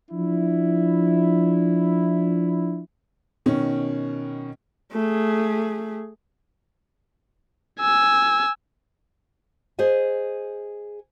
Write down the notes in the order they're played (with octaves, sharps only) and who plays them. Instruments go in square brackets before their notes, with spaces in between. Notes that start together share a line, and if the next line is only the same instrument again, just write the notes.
[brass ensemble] F3 D4 E4
[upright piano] B2 D#3 C#4
[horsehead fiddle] A3 G#4
[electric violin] G#5 E6
[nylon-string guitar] G#4 C5 D#5 G#5